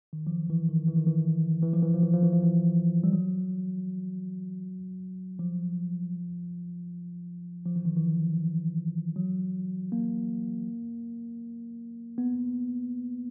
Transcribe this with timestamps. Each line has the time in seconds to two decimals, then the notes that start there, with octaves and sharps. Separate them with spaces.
0.13 D#3
0.27 F3
0.32 E3
0.50 E3
0.69 D#3
0.88 E3
0.97 D#3
1.07 E3
1.62 E3
1.73 F3
1.83 E3
1.94 F3
2.03 E3
2.14 F3
2.23 E3
2.33 F3
2.43 E3
3.04 G3
3.13 F#3
5.39 F3
7.66 F3
7.76 E3
7.85 D#3
7.97 E3
9.16 F#3
9.92 A#3
12.18 B3